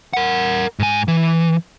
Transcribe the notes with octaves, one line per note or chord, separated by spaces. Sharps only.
A#4 F#5
G#2 G#5
E3